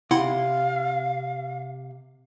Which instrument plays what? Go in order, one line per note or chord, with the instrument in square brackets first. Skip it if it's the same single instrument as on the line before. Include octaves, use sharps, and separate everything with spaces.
[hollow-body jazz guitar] C3 [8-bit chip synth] E4 F#5 C6 [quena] F5